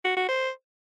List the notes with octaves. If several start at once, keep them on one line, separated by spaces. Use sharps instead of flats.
F#4
F#4
C5